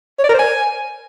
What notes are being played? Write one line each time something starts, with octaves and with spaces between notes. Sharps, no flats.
C#5
D5
A#4
C5
G#5